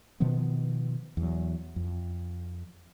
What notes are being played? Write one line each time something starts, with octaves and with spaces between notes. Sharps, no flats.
B2 D#3 F3 B3
E2 F#3
F2